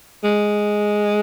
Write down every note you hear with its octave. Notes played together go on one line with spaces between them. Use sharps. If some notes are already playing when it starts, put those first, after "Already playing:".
G#3